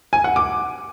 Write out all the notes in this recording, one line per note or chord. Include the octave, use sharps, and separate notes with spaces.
G#5
F#5
D6